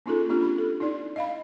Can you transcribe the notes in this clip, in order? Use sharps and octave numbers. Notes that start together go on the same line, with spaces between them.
A#3 C#4 D#4 F4 G#4 A4
C4 D4 F4 G4
G4 B5
A4
D#4 E4 D5
D#5 F5 B5